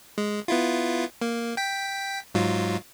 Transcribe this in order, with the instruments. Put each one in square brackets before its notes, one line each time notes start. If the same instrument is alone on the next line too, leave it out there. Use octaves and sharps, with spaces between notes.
[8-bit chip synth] G#3
B3 E4 F4
A#3
G5 B6
G#2 F#3 F4